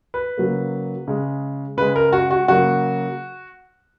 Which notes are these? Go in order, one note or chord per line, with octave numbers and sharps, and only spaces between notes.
B4
C#3 F#3 A#3
C#3 G#3
C#3 G#3 B4
A#4
F#4
F#4
C#3 F#3 A#3 F#4